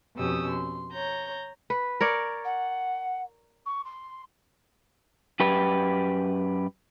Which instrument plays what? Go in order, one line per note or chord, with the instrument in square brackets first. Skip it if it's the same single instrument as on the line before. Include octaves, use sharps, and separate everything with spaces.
[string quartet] F2 B2 C#4 G4 D#6 E6
C6
C#5 A#5 G6
[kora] B4
A#4 C#5 D5
[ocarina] F#5
C#6
C6
[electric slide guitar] F#2 G4 B4